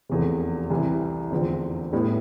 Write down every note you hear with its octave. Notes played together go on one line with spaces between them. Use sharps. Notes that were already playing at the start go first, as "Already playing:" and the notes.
F1 E2 C3
C2 C3 E3
F1 E2 D3 F3 C4
A2 G3 B3 E4